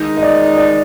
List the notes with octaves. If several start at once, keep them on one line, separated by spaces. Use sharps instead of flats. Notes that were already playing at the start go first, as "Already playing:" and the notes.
Already playing: D#3 G#3 D#4
D#5
D5
D5